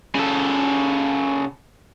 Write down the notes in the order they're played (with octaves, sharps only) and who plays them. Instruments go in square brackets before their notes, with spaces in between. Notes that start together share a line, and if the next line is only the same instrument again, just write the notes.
[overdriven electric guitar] C#3 A4